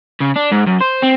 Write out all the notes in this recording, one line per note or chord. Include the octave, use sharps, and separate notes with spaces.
C#3
D4
G#2
F#2
C5
C4